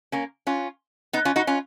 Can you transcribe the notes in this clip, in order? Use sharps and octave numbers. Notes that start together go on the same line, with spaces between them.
A#3 C#4
C#4 F4
B3 D#4
C#4 F4
D#4 F#4
C#4 F4